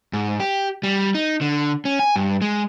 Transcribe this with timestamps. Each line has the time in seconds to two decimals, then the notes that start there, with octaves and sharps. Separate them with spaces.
0.13 G#2
0.40 G4
0.83 G3
1.15 D#4
1.41 D3
1.85 C#4
1.99 G#5
2.16 G2
2.41 G#3